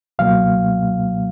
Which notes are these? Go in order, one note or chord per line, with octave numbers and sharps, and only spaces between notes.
C#2 B2 F#3 A#3 F5